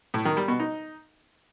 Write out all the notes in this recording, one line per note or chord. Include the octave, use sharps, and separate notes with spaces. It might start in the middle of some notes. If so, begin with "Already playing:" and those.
A2
D#3
G3
B2
D#4